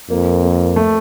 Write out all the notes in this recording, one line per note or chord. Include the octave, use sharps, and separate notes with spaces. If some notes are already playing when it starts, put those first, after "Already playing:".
F2 A#3
A#3
A3